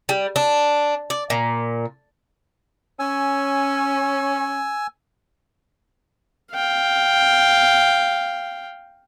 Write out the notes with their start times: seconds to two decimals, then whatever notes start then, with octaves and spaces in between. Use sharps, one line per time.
0.09 G3
0.36 D4
1.10 D5
1.30 A#2
2.99 C#4 G#5 E6
6.52 F5 G5